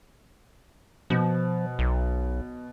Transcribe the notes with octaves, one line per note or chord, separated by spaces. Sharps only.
B2 F3
B1